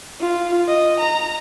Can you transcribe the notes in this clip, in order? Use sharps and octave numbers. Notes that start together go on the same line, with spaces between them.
F4
D#5
A#5